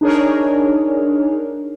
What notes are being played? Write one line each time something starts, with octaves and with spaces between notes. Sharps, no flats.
D4 D#4 G#4 A#4 C#5